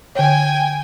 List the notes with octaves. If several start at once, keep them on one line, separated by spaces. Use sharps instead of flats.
D3 C#5 G5 G#5